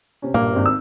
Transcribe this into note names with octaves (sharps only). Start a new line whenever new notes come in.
C3 C#4
A#1 G2 A#3 D4
G#1 C4
E6